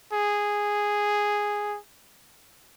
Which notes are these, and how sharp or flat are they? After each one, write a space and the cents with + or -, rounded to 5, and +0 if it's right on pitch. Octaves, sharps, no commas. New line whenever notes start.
G#4 -5